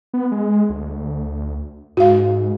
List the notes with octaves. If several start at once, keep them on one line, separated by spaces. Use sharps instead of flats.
B3
G#3
D2
G#2 F#4 F5